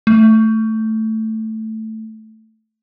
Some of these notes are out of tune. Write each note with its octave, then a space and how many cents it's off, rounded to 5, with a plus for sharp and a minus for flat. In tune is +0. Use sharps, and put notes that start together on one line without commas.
A3 +5